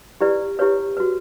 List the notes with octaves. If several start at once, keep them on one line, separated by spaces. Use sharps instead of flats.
E4 G4 B4 D5
E4 G4 B4 C#5
F#4 B4